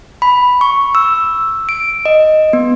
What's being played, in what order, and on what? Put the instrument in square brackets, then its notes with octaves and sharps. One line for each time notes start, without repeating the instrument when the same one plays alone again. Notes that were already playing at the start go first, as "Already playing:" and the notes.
[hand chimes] B5
C#6
E6
D7
D#5
B3